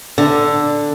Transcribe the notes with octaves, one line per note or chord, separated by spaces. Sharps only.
D3